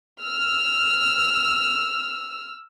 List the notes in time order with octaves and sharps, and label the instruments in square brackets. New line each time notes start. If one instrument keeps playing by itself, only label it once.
[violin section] E6 F6